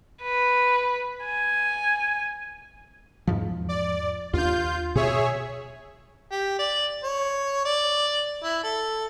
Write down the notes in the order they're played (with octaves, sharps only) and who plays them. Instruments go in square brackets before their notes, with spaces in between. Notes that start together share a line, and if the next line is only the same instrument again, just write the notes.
[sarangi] B4
G#5
[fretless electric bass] E2 G#2 F3
[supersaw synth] D5
[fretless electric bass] D#2 D4 [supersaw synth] F4 G6
[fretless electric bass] B2 [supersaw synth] G#4 C#5 E5
[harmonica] G4
D5
C#5
D5
E4
A4